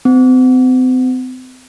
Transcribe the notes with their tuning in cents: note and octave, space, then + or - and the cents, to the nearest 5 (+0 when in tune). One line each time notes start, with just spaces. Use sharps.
C4 -40